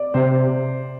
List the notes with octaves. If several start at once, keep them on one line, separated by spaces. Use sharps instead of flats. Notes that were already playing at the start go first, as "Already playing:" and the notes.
Already playing: D5
C3 C5